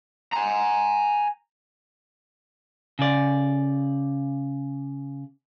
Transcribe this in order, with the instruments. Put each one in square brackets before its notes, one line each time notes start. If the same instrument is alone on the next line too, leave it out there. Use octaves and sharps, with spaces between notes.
[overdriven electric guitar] G#5 A#5
[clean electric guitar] C#3 D5